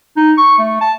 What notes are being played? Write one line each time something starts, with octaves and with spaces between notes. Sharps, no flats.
D#4
C#6
A3
A5